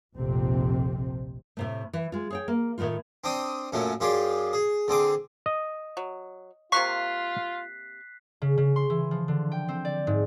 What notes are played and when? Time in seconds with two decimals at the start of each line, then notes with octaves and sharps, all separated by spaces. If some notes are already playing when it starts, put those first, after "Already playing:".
0.15 F1 A#1 F2 C3 C4
1.57 A2 C3 A3
1.93 E3
2.12 G#3 F4
2.30 G#4 C#5 G5
2.48 A#3
2.78 A2 D#3 F3 A3 F4
3.24 C4 D4 G5 D#6
3.72 F#2 A#2 F#3 A3 C#4
4.00 F#2 F4 G4 G#4 D5
4.53 G#4
4.88 D3 C4 G#4 D6
5.46 D#5
5.97 F#3
6.72 C3 A#3 F4 C#6 F#6 B6 C7
8.42 C#3
8.58 C#3
8.76 C6
8.90 E3
9.11 F3
9.28 D3
9.52 G5
9.68 C4
9.85 D5
10.07 G#2